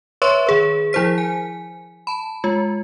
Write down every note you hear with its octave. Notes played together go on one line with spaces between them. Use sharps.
B4 C#5 E5 C6 C#6
D#3 G#4 B4
F3 E4 G#4 C5 B6
G#5
A5 B5
G#3 F4